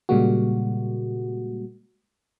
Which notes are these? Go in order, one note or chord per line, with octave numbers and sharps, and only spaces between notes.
A#2 C#3 G3 G#3 A#3 F#4